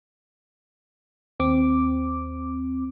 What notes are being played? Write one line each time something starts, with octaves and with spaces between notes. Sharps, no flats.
D#2 C4 D6